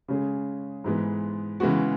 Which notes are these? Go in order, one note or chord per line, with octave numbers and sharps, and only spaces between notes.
C#3 G#3 C#4 G#4
G#2 E3 G#3 B3
C#3 E3 G#3 B3 F#4